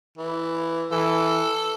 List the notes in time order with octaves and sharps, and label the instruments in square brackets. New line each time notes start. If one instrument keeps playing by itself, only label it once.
[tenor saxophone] E3
[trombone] E3 [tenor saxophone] A4